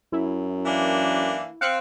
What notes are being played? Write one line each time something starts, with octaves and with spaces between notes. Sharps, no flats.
F#2 E4
E3 A#3 D4
C4 F5 F#6 C#7